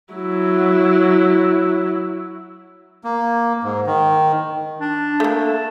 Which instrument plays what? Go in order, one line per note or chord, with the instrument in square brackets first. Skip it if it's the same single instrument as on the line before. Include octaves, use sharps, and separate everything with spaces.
[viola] F#3 E4
[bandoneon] A#3
G#2
D#3
[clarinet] D4
[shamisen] A3 A#3
[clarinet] A5